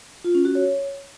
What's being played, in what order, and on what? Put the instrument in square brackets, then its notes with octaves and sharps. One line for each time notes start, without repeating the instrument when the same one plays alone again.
[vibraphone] F4
C#4
F#4
C#5